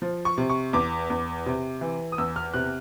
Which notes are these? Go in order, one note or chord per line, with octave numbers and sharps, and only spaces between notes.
F3
C#6
C3
C#6
E2 D6
E2
C3
E3
D#6
E2 E6
F6
C3 F#6